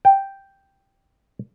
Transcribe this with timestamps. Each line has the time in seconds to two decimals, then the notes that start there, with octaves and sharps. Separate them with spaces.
0.05 G5